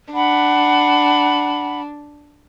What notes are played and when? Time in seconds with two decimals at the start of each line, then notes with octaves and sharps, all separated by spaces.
0.13 D4 F#5 B5